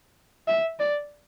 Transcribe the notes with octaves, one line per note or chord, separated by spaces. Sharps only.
E5
D5